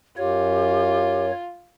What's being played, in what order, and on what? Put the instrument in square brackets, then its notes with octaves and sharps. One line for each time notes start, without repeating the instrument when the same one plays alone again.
[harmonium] F#2 [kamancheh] F4 [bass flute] G4 [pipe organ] C#5